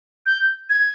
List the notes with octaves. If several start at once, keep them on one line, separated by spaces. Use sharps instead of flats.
G6
G#6